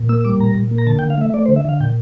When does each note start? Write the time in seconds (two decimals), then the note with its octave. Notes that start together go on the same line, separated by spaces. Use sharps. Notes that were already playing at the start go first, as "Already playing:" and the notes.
Already playing: A#2
0.09 A#3 E6
0.21 E6
0.24 G3 D6
0.40 A#2 A#5
0.55 A#2
0.71 A#3
0.78 A#5
0.87 D3 A5
0.99 G5
1.02 D3
1.10 F5
1.18 A3 E5
1.34 A3 D5
1.46 C5
1.48 D3
1.56 E5
1.65 D3 F5
1.80 A#2 G5